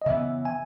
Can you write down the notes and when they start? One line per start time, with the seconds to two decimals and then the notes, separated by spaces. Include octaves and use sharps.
0.02 D#5
0.06 C#3 E3 B3 E5
0.45 G#5